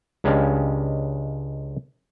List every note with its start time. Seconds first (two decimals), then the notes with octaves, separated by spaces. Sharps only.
0.24 C#2 G#3 C#4 D4 G4 F5